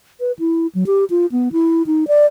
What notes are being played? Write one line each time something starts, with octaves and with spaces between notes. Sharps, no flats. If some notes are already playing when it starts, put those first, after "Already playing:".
B4
E4
F#3
G4
F4
B3
E4
D#4
D5